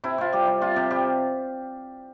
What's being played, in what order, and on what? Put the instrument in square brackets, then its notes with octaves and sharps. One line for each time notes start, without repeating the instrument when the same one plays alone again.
[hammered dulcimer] C3 E4
C3 F4
G3 G4
G3
C3 F4
C3 G4
G3 G4